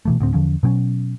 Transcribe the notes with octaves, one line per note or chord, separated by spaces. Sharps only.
B2 E3 A3
D2 A2 C4
E2 D3 F3 C#4
B2 F#3 C4 C#4